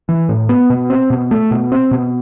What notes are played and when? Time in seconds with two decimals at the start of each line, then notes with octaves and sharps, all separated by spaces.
0.09 E3
0.29 A2
0.49 B3
0.70 B2
0.90 C4
1.10 B2
1.31 A3
1.51 B2
1.72 C4
1.91 B2